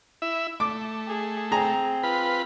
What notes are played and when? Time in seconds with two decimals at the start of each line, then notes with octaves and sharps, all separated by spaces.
0.22 E4 E5
0.60 A3 D6
1.08 G#4
1.52 C4 G#4 A#5
2.03 F4 B4 B5